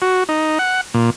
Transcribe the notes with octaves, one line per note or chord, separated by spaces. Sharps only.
F#4
D#4
F#5
A#2